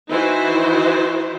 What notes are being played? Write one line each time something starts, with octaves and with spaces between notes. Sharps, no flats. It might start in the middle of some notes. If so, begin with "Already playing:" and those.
E3 D#4 E4 F#4 C5